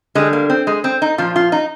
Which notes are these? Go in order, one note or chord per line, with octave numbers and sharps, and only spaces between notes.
D3 G3 G#3
A#3
C4
G#3
C4
D#4
A#2 F3 F4
F4
D#4